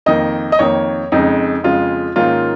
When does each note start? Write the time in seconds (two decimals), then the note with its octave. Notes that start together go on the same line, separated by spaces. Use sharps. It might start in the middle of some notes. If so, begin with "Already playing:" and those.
0.06 F2 D#3 A#3 D#5
0.52 D#5
0.59 F2 D#3 A#3 C#5
1.12 F2 C#3 G#3 D#4
1.64 F2 C#3 G#3 F4
2.16 G#2 D#3 A#3 C#4 F4